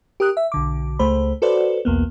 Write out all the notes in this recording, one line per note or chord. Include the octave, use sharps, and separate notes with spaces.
G4 A#4 D#6 F#6
E5
B1 D3 D6
C#2 A3 C5 B5
F#4 A4 B4 C5 D5
B1 E2 A#3 B3